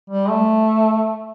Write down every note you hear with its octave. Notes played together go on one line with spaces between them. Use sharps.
G3
A3